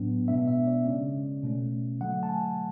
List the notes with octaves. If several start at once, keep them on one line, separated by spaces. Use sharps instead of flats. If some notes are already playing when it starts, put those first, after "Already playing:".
Already playing: A2 F#3 B3 D4
B2 G#3 B3 D4 E5
E5
D5
C#3 G#3 C#4
B2 A3 C#4
D3 F#3 A3 F#5
A5
G#5